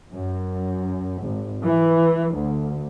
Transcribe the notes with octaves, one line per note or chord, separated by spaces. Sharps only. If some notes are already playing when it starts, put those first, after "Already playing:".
F#2
G#1
E3
D2